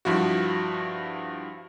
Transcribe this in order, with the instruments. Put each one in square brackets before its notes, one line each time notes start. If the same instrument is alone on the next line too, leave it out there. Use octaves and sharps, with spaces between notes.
[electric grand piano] G2 F3 E4 F#4